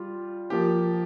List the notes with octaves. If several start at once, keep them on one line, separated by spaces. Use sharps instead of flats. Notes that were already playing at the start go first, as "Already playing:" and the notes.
Already playing: G3 F4
F3 A#3 G4